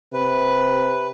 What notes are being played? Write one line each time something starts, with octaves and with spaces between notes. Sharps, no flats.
C3 B4